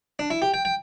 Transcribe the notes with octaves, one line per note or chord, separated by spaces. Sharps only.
D4
E4
G4
G5
G5